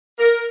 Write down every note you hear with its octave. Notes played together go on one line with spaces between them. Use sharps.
A#4